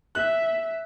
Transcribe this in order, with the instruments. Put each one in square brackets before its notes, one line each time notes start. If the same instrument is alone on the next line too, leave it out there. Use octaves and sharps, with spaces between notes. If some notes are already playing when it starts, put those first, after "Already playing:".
[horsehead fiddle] E5 [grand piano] F#6